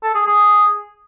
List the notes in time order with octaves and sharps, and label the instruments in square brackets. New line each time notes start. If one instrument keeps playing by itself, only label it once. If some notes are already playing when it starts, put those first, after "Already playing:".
[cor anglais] A4
G#4
G#4